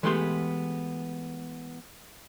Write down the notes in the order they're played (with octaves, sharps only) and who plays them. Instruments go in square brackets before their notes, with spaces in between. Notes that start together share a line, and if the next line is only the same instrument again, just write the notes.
[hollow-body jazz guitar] E3 G#3 A3 B3 G4 C6